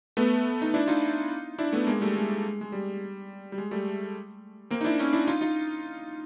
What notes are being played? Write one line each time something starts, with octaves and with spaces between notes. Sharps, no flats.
A3 B3
D#4
D4 E4
D#4 F4
D4 E4
A3 B3
G#3 A#3
G3 A3
G#3
G#3
G3
G3
G#3
G3 A3
A#3 C4
D#4
D4 E4
C#4 D#4
D4 E4
D#4 F4
D#4 F4